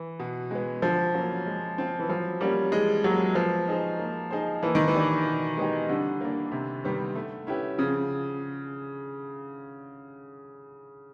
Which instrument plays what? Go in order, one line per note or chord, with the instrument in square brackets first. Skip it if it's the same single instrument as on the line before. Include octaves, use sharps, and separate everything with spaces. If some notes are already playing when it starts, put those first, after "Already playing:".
Already playing: [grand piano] E3
[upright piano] B2
G#3 B3
[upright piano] D3 [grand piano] F3
[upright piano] F#3 A#3 C#4
G#3
C4 F4
[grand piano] E3
[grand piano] F3 [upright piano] F#3
[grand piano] G3 [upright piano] A#3 C#4 F#4 A#4
[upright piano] E3 [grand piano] G#3
[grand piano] F#3 [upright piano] G3 A#3
[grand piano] F3 [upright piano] B3
[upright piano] D#4 G#4 C5
A#3
D#4 G#4 C5
[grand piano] E3 [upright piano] A#3
[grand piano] D#3
E3
[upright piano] D4 G4 B4 D5
B2
G#3 B3 D#4 G4
[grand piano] D3 [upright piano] G3
[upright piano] A#3 D4
C3
D#3 G3 B3
A3
C#4 E4 G4 B4
[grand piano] C#3 [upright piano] F3